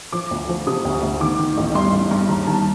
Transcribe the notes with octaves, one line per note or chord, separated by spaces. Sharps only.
F3 D6
D2
F3
C3 D#6
D2
D2
D#3 D6
D#3
A1
G2 C6
A1
G2
D#2 A#5
D#3 A5